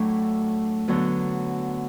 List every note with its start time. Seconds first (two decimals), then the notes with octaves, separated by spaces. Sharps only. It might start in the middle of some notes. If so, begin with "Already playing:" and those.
Already playing: A2 F#3 A3 D4
0.88 D3 F#3 B3